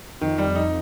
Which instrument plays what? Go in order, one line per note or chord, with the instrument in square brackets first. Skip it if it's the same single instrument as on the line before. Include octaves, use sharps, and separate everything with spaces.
[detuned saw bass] F2 [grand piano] D#3
[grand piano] G3
D#4